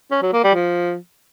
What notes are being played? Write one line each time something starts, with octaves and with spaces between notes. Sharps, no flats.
C#4
F#3
A#3
G3
F3